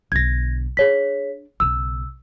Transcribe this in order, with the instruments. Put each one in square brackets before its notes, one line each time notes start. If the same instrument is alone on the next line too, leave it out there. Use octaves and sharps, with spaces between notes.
[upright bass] B1 D3 [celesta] G#6 A#6
[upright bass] D4 [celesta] G#4 C#5 B6
[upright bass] B1 C#3 [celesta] E6